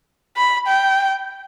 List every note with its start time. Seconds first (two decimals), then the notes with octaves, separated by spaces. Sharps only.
0.37 B5
0.67 G5